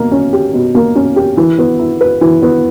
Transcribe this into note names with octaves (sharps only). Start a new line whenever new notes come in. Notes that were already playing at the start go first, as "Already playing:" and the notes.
Already playing: B2 A#3
C#4
G4
B2
A#3
C#4
G4
E3
B3
E4
B4
E3
B3